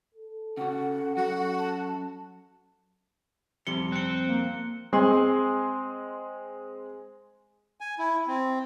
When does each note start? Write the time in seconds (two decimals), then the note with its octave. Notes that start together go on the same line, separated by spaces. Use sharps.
0.14 A4
0.57 C#3 F#4 F#5
1.17 F#2 F#4
1.59 A5
3.67 F2 C3 G3 C#7 G7
3.92 C4 F#6 C#7
4.28 A#3
4.93 G#3 C4 G#4 C6
7.81 G#5
7.99 E4
8.27 C4